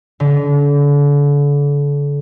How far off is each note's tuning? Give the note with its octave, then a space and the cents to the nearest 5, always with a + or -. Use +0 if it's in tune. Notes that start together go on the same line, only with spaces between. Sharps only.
D3 -35